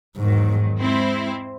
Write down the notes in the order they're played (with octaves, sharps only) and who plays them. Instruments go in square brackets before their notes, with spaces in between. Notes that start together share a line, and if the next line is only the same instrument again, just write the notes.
[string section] E2 D#3 F#3 [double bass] G#2
[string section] G#3 C4 E4 C5